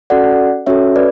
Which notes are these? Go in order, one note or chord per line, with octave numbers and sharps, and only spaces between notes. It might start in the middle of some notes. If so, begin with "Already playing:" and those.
C#4 F#4 A4 D5 F#5
C#4 F#4 A4 C#5 E5
B4 D5